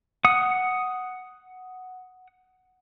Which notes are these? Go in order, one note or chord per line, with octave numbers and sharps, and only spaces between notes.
F#5 D#6